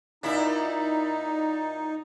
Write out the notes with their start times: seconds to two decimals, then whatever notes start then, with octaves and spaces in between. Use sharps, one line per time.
0.23 A#2 D#4 E4